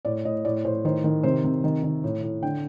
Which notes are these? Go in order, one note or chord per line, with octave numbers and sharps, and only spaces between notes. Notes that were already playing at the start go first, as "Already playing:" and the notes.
A2 D5
A2 D#5
A2 D5
A2 C5
D#3 C5
D#3
C3 C5
C3
D#3
D#3
A2
A2
D3 G5